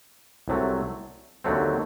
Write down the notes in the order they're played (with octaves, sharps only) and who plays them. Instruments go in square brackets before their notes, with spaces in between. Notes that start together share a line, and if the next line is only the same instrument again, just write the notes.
[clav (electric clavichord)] C2 C3 F#3 A3
D#2 D3 F#3 A3 C4